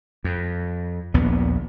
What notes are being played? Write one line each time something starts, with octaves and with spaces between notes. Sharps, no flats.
F2
A#1 D#2 B3